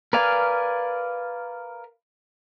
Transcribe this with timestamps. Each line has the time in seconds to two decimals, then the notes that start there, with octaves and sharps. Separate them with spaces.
0.13 A#4 B4 D5 F5 G#5